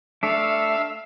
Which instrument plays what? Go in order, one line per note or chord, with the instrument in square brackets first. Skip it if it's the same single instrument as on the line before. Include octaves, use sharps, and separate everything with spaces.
[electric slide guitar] A3 D4 [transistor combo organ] E5 [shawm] F5